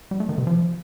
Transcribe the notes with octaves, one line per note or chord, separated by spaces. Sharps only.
G3
A3
D#3
C3
F3